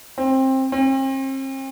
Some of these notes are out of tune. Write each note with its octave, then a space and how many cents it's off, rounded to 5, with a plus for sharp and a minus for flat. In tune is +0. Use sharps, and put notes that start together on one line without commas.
C4 +20
C4 +40